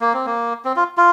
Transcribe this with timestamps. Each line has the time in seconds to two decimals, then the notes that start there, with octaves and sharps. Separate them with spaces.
0.01 A#3
0.13 C4
0.26 A#3
0.65 C4
0.76 F4
0.97 F4